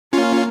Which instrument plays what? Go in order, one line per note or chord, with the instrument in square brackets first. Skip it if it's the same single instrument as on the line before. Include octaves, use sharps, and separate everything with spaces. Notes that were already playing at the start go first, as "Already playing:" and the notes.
[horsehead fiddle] A#3 [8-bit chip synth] C#4 F4